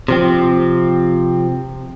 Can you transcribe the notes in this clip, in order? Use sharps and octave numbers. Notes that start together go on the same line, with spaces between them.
C3 F3 C4